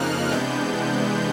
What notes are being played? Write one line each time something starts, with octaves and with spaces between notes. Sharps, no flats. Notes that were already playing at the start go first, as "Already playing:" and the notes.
Already playing: F2 C#3 F3 A#3 D#4 F6 F#6
C3 E3 G#3 B3 D4 G6